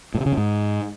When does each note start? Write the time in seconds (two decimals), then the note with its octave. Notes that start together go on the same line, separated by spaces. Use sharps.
0.14 A2
0.20 C3
0.26 C#3
0.32 F2
0.37 G#2